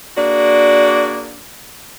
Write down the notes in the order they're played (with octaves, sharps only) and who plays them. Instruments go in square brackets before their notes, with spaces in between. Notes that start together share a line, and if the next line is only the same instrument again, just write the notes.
[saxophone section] A#3 D4 F#4 G#4 D5